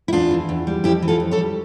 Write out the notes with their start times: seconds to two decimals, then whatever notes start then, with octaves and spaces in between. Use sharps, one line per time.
0.08 E4
0.12 E2 D4 F4
0.31 E3
0.49 E2
0.67 G3
0.84 F2 E4 G4
1.02 E3
1.08 F4 A4
1.20 F2
1.31 A4 C#5
1.38 G3